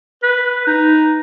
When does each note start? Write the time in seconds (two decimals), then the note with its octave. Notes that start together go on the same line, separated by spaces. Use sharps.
0.23 B4
0.67 D#4